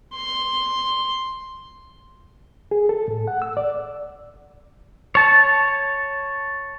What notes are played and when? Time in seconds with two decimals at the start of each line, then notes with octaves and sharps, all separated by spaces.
0.15 C6
2.71 G#4
2.89 A4
3.08 A2
3.27 F#5
3.42 E6
3.57 D5
5.15 C#5 A5